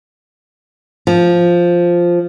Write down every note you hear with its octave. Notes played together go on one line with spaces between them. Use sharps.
F3